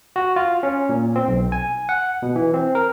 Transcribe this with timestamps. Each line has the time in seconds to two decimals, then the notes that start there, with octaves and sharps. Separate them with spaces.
0.16 F#4
0.36 F4
0.63 C#4
0.89 A#2
1.16 C4
1.28 B1
1.52 G#5
1.89 F#5
2.22 B2
2.36 E3
2.54 C4
2.75 A#4